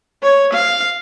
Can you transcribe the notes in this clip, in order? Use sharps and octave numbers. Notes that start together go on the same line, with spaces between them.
C#5
F5